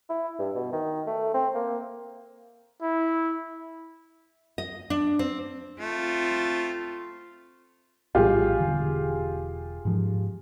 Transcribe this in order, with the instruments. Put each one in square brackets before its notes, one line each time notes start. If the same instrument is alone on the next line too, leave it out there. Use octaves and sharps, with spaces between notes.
[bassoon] E4
G2
B2
D#3
A3
C4
A#3
[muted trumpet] E4
[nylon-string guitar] D#5
D4
C4
[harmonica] A3 [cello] C4 F4
[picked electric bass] A#1 A2 G3 [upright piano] F4 G4 G#4
[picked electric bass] E1 D3
G#2 F3